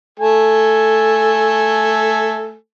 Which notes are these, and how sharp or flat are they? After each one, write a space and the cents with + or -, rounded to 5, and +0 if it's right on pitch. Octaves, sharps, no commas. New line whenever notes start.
A3 +0 A4 +0 G#5 +0